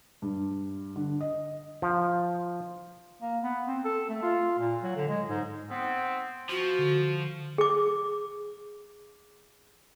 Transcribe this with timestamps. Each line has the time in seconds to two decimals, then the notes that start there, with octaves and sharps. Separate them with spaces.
0.22 G2
0.96 D3
1.21 D#5
1.82 F3
3.22 A#3
3.43 B3
3.67 C4
3.85 A4
4.09 A3
4.23 F4
4.59 A#2
4.83 F#3
4.96 D3
5.08 G#3
5.29 G#2
5.70 B3 C4
6.50 F3 F#4
6.79 D3
7.58 G#4 D6